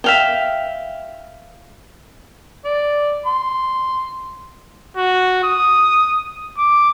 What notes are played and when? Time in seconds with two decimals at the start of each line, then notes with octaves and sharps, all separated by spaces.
0.04 E5 F5 G5
2.65 D5
3.26 C6
4.97 F#4
5.44 D#6
6.58 D6